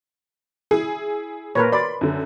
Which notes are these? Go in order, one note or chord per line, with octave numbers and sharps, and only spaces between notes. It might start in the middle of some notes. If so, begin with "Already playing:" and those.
E4 G#4
A#2 A#4 B4 C#5
D5 B5 C6
F#2 D3